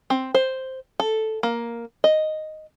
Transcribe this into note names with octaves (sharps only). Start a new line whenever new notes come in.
C4
C5
A4
A#3
D#5